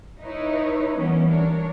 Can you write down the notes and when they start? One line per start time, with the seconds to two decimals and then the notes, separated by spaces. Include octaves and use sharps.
0.19 D#4 E4 B4 C#5
0.96 E3 G3 A#3 B3 C#4
1.28 D4 A#4 C#5